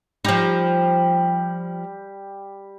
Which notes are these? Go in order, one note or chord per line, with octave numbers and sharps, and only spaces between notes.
F3 G3 D#4 G4